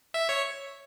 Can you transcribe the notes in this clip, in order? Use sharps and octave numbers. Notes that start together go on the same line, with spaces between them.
E5
C#5